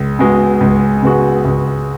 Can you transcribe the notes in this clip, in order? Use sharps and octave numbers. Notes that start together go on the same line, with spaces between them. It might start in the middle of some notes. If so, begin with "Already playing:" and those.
Already playing: C#2
C#3 G#3 B3 F#4
C#2
C#3 G#3 B3 F#4
C#2